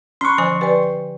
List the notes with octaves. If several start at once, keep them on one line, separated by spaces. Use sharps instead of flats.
C#4 A#5 C6 C#6 F6 F#6
D3 F3 C5 G#5
G4 B4 D5 G5 G#5